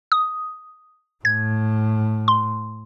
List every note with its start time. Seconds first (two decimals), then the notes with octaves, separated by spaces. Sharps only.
0.12 D#6
1.25 A2 G#6
2.28 C6